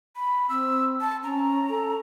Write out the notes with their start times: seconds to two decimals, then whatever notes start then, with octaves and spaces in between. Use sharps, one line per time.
0.16 B5
0.49 C4 E6
1.01 A5
1.23 C#4 A#5
1.70 A4